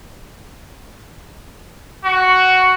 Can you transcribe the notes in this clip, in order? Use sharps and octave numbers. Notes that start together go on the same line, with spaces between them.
F#4